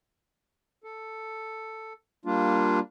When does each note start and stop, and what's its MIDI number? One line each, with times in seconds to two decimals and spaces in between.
0.84 1.93 69
2.25 2.79 55
2.25 2.79 58
2.25 2.79 62
2.25 2.79 65